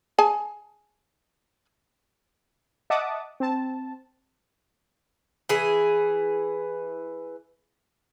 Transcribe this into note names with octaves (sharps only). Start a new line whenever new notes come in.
G#4 G#5 A5
D#5 E5 F#5 A5 D6 D#6
C4 A5
E3 G#4